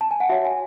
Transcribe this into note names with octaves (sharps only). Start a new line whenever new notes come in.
A5
G#5
F#5
F#4 C#5 E5
G#5